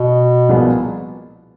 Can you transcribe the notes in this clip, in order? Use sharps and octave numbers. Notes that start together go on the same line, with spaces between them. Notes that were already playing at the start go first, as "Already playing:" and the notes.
Already playing: B2
C2 A#2 F3 G#3 B3